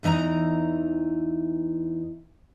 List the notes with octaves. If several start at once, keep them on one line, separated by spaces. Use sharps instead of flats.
E2 E3 D#4 E5 A#5